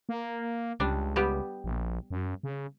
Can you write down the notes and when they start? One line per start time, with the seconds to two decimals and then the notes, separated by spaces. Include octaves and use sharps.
0.09 A#3
0.80 C#2 G3 D4
1.16 G3 B3 G4
1.64 A#1
2.11 F#2
2.43 C#3